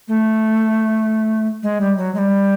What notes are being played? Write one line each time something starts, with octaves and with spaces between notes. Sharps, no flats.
A3
G#3
G3
F#3
G#3
G3